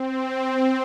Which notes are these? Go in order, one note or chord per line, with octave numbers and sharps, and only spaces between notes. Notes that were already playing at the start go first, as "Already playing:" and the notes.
Already playing: C4
C4